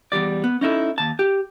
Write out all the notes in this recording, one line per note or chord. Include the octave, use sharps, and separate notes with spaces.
E2 G2 G3 D5
B3
C#4 D#4 E4 A4
D#2 A5
G4